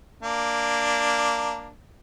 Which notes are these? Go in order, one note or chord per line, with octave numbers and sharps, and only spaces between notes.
A#3 D4